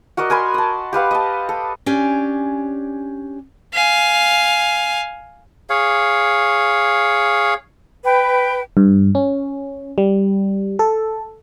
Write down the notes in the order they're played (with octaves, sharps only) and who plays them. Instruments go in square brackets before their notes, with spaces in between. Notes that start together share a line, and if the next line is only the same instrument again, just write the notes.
[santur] F#4 A#4 D5 D#5
A#4 G#5 B5 C6
A5 D#6
G4 B4 F5 F#5
D#5 A5
A4
[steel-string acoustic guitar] C#4 D4 G4 C#5 D5 G#5
[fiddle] F5 G#5
[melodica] G#4 C#5 F5
[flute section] B4 G5
[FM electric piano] G2
C#4
G3
A4